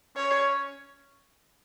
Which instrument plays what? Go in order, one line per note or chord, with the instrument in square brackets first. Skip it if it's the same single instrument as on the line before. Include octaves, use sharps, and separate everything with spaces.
[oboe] C#4 [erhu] C#5